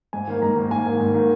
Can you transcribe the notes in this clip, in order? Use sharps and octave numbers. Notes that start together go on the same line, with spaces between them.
G#2 G#5
D#3 A#3
G#2 A#5
D#3 A#3
G#2 G#5
D#3 A#3
G#2
D#3 A#3